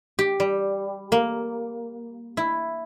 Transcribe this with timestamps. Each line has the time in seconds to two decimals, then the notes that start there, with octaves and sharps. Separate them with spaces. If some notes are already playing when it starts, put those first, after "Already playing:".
0.19 G4
0.40 G3
1.12 A#3
2.37 E4